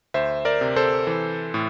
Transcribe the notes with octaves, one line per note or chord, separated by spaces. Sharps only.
D2 C5 E5
A#4 D5
C3
A4 C5
E3
A2